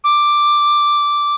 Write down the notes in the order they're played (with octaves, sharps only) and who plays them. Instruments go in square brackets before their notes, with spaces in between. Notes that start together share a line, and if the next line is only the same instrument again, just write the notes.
[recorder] D6